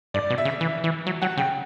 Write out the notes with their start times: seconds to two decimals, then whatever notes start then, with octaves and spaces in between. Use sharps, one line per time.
0.14 G2 D5
0.30 B2
0.38 E5
0.45 C#3
0.61 E3
0.84 E3
1.07 F#3
1.22 F#3 F#5
1.37 C#3 G5